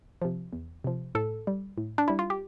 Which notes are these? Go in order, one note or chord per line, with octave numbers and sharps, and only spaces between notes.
C3 F3
E2
C3 F3
A2 A4
G3
A2
D4
G3 E4
F4
G4